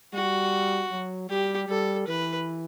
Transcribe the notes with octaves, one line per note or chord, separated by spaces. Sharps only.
G3 F#4
F#3
G3 G4
G3 A4
E3 B4